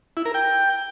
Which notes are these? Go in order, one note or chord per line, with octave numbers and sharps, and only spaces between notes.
E4
A#4
G5